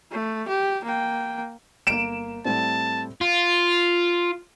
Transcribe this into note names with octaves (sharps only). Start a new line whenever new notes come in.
A3
G4
A#3 G5
G1 A#3 D7 E7
A2 G3 C4 A5
F4